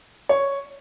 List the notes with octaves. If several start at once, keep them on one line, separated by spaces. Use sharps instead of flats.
C#5